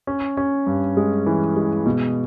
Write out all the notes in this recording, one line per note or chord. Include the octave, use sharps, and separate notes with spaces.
C#4
C#4
G2
G#3
E3
G#3
B2